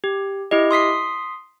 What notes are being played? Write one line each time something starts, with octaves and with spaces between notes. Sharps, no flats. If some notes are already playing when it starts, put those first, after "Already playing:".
G4
E4 G4 D#5
C6 D#6 B6 C7